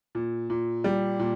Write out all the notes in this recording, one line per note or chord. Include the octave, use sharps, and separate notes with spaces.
A#2
A#2
G3
A#2